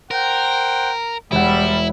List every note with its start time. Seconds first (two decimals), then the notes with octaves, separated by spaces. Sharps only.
0.11 A#4 C5 F#5 G5
1.32 E1 F3 G3 E4 F#5